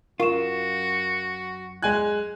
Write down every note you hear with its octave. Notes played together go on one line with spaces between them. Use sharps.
F#2 F4 F#4 A#4 C#6 E7
G#3 G#5 F#6 G#6